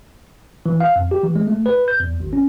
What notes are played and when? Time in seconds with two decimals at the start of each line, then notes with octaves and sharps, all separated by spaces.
0.66 E3
0.80 F5
0.96 F2
1.11 G4
1.23 E3
1.35 G#3
1.47 A3
1.66 B4
1.88 G6
2.00 E2
2.20 G#1
2.33 C#4